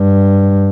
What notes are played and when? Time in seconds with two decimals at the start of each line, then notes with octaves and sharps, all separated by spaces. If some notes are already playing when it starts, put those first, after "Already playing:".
Already playing: G2